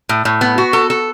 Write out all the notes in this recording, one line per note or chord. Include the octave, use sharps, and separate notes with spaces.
A2
A2
B3
F#4
A4
A4